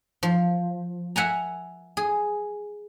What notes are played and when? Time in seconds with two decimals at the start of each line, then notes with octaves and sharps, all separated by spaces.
0.23 F3
1.16 E5 F#5 G#5 A#5
1.97 G#4